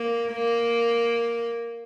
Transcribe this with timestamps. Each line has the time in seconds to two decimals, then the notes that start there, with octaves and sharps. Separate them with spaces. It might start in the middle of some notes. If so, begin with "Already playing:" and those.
Already playing: A#3
0.32 A#3